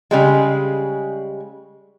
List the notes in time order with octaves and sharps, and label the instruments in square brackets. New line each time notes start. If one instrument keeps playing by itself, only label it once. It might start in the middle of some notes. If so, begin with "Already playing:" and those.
[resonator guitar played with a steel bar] C#3 G3 G#3